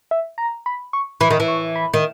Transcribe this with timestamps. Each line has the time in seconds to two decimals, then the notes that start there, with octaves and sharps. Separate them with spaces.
0.11 E5
0.38 A#5
0.66 B5
0.93 C#6
1.21 E3 B5
1.30 D#3
1.40 E3
1.48 C#6
1.76 B5
1.94 D#3